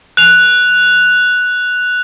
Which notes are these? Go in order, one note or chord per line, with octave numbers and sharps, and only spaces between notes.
F#6 F7